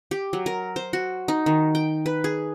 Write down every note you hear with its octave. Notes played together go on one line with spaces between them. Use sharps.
G4
F#3
A#4
C5
F#4
D#4
D#3
G5
B4
G#4